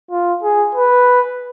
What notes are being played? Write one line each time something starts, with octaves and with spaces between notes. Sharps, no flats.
F4
G#4
B4